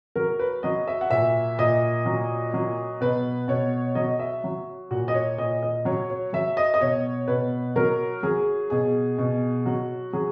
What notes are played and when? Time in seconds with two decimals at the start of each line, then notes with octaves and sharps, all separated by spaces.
0.15 F#3 A#4
0.39 B4
0.63 F#3 D#5
0.87 E5
1.01 F#5
1.10 A#2 E5
1.58 A#2 D#5
2.05 F#3
2.54 F#3
3.01 B2 B4
3.48 B2 C#5
3.95 F#3 D#5
4.19 E5
4.44 F#3
4.91 A#2 F#4
5.08 D#5
5.14 C#5
5.38 A#2 D#5
5.63 D#5
5.85 F#3 C#5
6.10 C#5
6.33 F#3 E5
6.57 D#5
6.74 D#5
6.81 B2 C#5
7.28 B2 B4
7.76 F#3 A#4
8.23 F#3 G#4
8.70 B2 G#4
9.18 B2
9.66 F#3 F#4
10.13 F#3 G#4